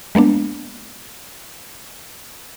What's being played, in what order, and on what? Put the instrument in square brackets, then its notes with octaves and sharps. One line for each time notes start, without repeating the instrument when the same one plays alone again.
[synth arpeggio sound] G#3 A#3 B3 D4